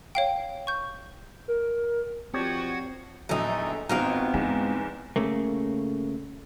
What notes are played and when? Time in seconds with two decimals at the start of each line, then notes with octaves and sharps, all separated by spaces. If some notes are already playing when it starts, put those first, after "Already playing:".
0.15 C#5 F5 G5
0.67 C#6 G6
1.48 A#4
2.34 F3 C4 F#4 G4 C#5 D5 F#5 G#6
3.29 A#1 E2 F#3 A3 D#4
3.89 G#1 G#2 B3 C4 D#4 F4 F#4 G5
4.34 E2 G#2 G#3
5.16 C#3 A3 A#3